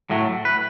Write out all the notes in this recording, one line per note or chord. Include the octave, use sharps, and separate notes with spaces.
A2 F#3 A3
B4